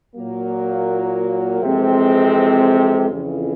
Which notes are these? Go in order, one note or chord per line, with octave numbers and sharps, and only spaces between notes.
A#2 F#3 A#3
F2 C3 E3 G#3 C4
F2 C#3 E3